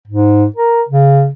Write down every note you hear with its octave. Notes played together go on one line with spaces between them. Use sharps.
G#2
A#4
C#3